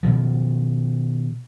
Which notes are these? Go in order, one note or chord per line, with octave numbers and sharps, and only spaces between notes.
B2 D#3 F3